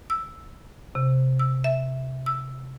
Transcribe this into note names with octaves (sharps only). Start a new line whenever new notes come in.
E6
C3
E6
E5
E6